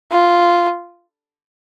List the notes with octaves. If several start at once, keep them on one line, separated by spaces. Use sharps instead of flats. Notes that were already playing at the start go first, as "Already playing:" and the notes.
F4